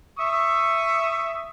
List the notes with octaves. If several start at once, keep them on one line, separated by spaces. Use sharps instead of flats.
E5 C#6 D#6